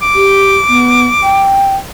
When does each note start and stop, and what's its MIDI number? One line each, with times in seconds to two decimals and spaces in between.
0.02 1.50 86
0.15 0.55 67
0.69 1.06 59
1.23 1.75 79